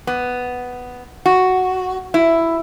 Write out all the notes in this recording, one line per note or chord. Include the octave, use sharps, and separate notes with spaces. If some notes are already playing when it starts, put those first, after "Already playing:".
B3
F#4
E4